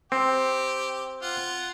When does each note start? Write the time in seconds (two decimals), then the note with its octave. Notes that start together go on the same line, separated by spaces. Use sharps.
0.12 C4 G4
1.22 F4 F#5